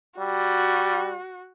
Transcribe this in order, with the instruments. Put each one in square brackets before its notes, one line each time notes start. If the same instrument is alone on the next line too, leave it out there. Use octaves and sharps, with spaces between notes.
[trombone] G3 [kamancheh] F#4